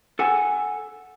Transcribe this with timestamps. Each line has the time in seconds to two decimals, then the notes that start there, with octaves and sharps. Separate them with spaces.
0.19 A4 F#5 G#5